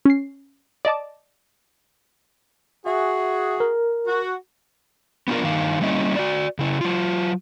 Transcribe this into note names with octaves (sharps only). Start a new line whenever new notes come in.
C#4 C7
D5 D#5 A5 D6
F#4 G#4 E5
A#4
F#4
B3 D4 F4 A#4
G2 D#3 D#4 F5
G3 A#3 C#4 E4 D#5
F#4 D5
C#3 E4
F#3 F4